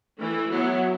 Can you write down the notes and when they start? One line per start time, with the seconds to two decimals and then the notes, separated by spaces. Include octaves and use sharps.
0.20 E3 A3 E4
0.50 F#3 B3 E4